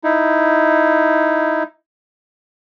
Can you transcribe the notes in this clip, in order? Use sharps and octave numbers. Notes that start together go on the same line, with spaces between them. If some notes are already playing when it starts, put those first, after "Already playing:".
D#4 E4